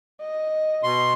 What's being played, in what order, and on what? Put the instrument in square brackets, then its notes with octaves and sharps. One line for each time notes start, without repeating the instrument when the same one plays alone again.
[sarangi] D#5
[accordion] B2 C6